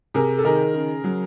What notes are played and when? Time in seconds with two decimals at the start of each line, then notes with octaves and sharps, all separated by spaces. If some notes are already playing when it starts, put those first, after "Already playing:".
0.14 C3 G#4 A#4
0.38 A4
0.44 D#3 G#4 A#4
0.74 C#3
1.04 F#3